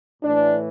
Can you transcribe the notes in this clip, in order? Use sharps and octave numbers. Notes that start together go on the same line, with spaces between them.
A2 E3 D4